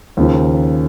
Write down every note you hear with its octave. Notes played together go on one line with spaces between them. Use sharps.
D#2 C#3 F3